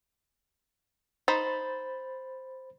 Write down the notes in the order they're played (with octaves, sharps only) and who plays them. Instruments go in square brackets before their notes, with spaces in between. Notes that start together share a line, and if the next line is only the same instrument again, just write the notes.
[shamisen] D#4 [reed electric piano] C5 B5 A6